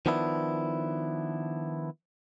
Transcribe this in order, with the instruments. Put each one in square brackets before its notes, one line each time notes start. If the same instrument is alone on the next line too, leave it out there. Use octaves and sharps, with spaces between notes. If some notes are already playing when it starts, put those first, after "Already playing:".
[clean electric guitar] D#3 F3 B3 D4 E4